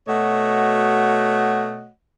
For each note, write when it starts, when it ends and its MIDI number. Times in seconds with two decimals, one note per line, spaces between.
0.08 1.89 47
0.08 1.89 57
0.08 1.89 66
0.08 1.89 73
0.08 1.89 75
0.08 1.89 78